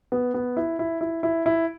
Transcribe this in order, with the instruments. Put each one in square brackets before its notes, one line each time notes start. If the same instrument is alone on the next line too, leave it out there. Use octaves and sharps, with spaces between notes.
[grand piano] B3
B3
E4
E4
E4
E4
E4